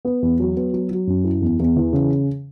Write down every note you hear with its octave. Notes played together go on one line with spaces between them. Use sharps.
B3
E2
F#3
B3
F#3
F#3
F#2
E4
E2
E2
E3
C#3